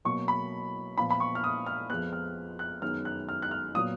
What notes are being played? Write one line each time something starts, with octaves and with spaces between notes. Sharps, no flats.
B2 F#3 A#3 C#6
B5
A#2 F3 B3 B5
B5
C#6
F6
D#6
F6
F2 F3 G#3 B3 F#6
F6
F#6
F#2 D#3 G#3 B3 F6
F#6
F6
F#6
F6
A#2 F#3 B3 D#6